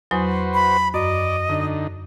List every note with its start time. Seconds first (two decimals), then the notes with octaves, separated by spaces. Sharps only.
0.11 E2 F#3 F#4 B4 C5 D#6
0.54 B5
0.94 F#2 D5 D#5
1.49 D3 D#4